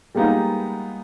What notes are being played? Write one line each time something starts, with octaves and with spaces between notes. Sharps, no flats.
G3 G#3 A#3 B3 D#4 F4